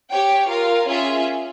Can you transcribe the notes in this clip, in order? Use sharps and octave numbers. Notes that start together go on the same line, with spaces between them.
G4 C#5 G5
F4 A#4 F5
C#4 F4 G#4 E5